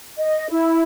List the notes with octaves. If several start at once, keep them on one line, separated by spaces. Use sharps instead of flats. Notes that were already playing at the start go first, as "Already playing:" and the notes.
D#5
E4